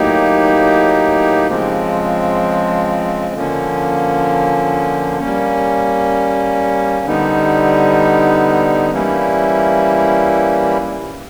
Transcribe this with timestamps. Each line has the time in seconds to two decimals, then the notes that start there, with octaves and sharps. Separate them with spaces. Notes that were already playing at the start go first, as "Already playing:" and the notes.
Already playing: A2 F#3 A#3 D#4 G4
1.47 C#3 F3 G#3 C4
3.33 D3 F3 A#3 C#4
5.20 G3 A#3 C#4
7.05 D3 G3 B3 D#4
8.91 E3 G3 A#3 C#4 E4